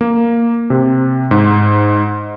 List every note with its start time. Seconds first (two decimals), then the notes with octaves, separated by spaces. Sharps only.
0.01 A#3
0.70 C3
1.31 G#2